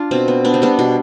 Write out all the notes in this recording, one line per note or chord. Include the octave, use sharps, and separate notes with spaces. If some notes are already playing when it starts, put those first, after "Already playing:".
Already playing: D4 F4
B2 C4
B3
B3 D4
C4
G3 B3 D4
B2